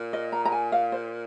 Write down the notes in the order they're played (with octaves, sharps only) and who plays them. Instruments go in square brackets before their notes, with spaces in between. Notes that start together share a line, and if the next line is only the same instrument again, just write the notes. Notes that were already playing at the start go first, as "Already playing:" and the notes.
Already playing: [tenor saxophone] A#2
[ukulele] D#5
A#5
A#5
G#5
F5
C5